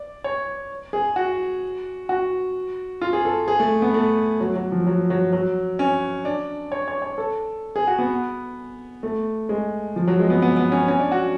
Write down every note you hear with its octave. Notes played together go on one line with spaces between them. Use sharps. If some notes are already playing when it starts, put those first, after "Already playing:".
Already playing: D5
C#5
G#4
F#4
F#4
F4
G#4
A4
G#4
A3
B3
A3
F#3
F#3
F3
F#3
F#3
F#3
C#4
D4
C#5
C#5
C#5
A4
G#4
F#4
B3
A3
G#3
F3
F#3
G#3
B3
B3
B3
C#4
C#4
D4
F#4